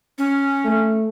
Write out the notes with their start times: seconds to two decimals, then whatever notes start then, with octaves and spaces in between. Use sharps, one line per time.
0.18 C#4
0.65 A3